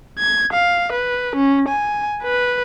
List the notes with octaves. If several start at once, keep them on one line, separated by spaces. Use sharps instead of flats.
G#6
F5
B4
C#4
G#5
B4